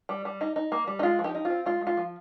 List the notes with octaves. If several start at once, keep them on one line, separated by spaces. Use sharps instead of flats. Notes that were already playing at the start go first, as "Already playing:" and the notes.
G3
G3
D#4
D#4
A#3
G3
D#4
G#3 F4
F3
D#4 G4
D#4
F4
C4
G#3 F4
G#3
F4
F3